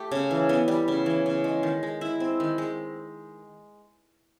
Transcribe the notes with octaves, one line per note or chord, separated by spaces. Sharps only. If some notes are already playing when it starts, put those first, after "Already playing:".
Already playing: A3 G4
C#3
E3
B3
G3
C#3
E3
C#3
G#3
D#3
G#3
E4
C4
D#3
G#3